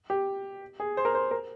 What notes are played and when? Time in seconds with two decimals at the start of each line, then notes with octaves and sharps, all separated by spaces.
0.10 G4
0.80 G#4
0.97 C5
1.05 A#4
1.15 C5
1.31 A#4